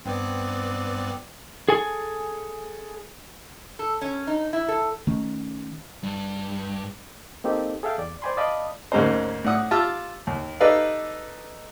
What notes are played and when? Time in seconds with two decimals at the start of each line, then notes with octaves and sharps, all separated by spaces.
0.05 G2 B3 C4 D5
1.69 G#4 A4 G#5
3.79 A4
4.01 C#4
4.27 D#4
4.53 E4
4.68 A4
5.07 D#3 A3 C#4
6.03 G2
7.44 A#3 C4 D#4 G4 A4
7.83 G#4 A4 E5 F5 G5
7.98 E2 D5
8.22 C5 D5 G5 G#5 B5 C6
8.37 D5 D#5 F5 A5 B5 D#6
8.92 D2 G#2 A#3 C#4 D#4 C5
9.44 A2 D4 F#5 D#6
9.71 F4 G4 A5 E6 F6
10.27 D#2
10.60 D#4 G4 A4 B4 D5 F5